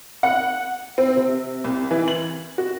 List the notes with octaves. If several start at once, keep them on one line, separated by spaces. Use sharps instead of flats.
F#5
C4
C3
C2
E3
F#7
F#4